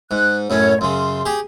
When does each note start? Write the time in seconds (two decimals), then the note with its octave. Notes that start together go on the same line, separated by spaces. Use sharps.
0.11 G#2 F#6
0.50 F#2 A2 C#4 C#5
0.81 F#2 C#3 C6
1.26 G4 G#4